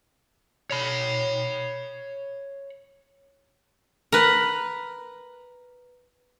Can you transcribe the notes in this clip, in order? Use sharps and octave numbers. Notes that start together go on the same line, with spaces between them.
C#5 B5
A#4 B4